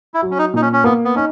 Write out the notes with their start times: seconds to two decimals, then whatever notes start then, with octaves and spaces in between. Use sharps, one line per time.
0.14 E4
0.22 F#3
0.31 C#4
0.38 D#4
0.54 A#2 D#4
0.62 C#4
0.73 C#4
0.84 A#3 B3
1.05 B3
1.16 C#4 D#4